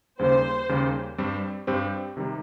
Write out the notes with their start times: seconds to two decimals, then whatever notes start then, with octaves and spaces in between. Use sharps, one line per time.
0.19 D#2 C#3 G3 A#3 C#4 C5
0.69 D#2 C#3 G3 A#3 C#4
1.18 G2 G3 C4 G4 C5
1.67 G2 G3 C4 G4 C5
2.17 C3 D#3 G3